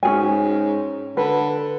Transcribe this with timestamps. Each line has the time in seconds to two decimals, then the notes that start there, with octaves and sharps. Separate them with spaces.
0.03 G#2 C#4 G#4 G#5
1.17 D3 B4